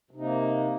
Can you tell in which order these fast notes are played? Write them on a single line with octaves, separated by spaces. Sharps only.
C3 D#4 A#3